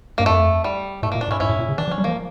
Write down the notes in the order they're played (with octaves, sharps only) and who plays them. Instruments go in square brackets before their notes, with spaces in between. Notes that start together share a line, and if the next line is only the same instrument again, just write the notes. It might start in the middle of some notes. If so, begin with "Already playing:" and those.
[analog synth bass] G2 [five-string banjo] A#3
[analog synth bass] F2 [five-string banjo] A3
[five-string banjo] G3
[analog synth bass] A2 [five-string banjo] A3
[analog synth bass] A#2 [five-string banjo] A#3
[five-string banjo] D4
[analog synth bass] A2 [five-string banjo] C#4 E4
[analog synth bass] G2 [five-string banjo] C#4 E4
[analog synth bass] A2
A#2
C#3
[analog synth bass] E3 [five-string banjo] D4
[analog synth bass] F3
[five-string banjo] C#4
[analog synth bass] G3
[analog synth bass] F3 [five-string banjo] A#3